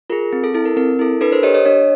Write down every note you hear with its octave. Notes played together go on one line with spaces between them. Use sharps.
F4 G#4 A#4
C4
A4
E4 A4
A#4
C4 A#4
E4 A4
D4 A4 B4
A#4 C5
G4 C#5 D#5
C#5 D#5
D4 C#5 D#5